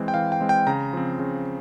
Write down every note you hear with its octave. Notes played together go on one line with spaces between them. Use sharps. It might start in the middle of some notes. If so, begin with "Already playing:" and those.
Already playing: E3 G#3 C4
G5
E3 F5
G5
G#3 C4
G5
C#3 A#5
F3 C4
C#3